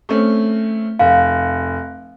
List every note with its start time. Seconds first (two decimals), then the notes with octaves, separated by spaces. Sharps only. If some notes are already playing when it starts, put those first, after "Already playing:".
0.09 A3 C4 C#4
0.99 F1 F5